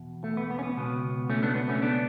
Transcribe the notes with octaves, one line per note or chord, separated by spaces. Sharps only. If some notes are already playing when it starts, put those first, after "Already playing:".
Already playing: E2 B2
A3
B3
B3
C#4
B3
C#2 B2
A3 C#4
B3 D4
B3
A3 C#4
B3 D4